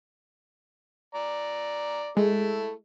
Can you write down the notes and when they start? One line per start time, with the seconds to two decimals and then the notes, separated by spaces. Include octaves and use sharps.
1.15 D5 A#5
2.17 G#3 A3 E4